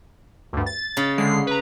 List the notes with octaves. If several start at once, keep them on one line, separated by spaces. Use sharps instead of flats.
D2 G2
A6
C#3
D3 G#3 C7
B4 A#5